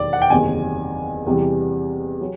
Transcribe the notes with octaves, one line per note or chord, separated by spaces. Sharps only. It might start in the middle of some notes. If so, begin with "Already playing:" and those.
Already playing: E1 D#2 D#3 F#3 D5
F#5
G5
F#1 E2 C3 D#3 F#3 G#5
E2 C3 E3 G3
F#3